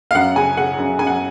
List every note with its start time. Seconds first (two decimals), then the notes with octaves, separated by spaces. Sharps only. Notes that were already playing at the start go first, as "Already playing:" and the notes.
0.11 F5
0.14 F#2 F#5
0.36 C#3 G#5
0.57 C#3 F#5
0.78 F#2
0.99 F#2 G#5
1.07 F#5